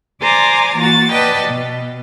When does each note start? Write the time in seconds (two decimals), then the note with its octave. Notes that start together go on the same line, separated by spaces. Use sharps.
0.20 C5 D5 G#5 A#5 D6 A6
0.75 E3 A#3 F#4 A6
1.11 B4 D5 D#5 F#5 G5 A5
1.46 B2